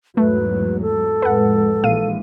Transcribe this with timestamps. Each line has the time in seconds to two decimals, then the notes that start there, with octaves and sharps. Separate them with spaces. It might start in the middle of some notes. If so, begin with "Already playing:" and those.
0.17 E2 G#2 F#3 A3 B4
0.81 A4
1.22 F2 A2 G#3 B4 F#5
1.83 A#1 A#2 E3 G#3 F5 D#7